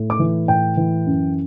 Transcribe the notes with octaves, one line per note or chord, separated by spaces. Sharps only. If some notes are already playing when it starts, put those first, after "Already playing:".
Already playing: A2
D6
E3
A2 G5
E3
F#2